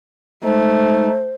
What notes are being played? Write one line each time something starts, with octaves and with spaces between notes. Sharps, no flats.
G#3 A3 D#4 C5